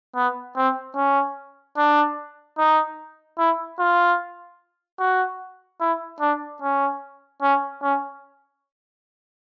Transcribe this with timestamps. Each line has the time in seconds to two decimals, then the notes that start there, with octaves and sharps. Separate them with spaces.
0.15 B3
0.56 C4
0.96 C#4
1.77 D4
2.58 D#4
3.38 E4
3.79 F4
4.99 F#4
5.80 E4
6.20 D4
6.62 C#4
7.42 C#4
7.82 C#4